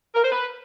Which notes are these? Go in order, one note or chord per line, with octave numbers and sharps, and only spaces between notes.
A#4
C5
B4